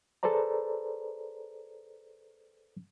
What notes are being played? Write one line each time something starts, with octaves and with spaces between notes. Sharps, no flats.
G#4 A4 B4 C5 D5 A#5